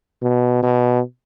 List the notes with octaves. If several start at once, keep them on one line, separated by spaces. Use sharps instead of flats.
B2
B2